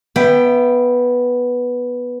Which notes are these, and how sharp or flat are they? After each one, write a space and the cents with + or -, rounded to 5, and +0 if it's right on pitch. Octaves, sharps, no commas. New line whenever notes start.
B3 -5 E5 +25 G5 +0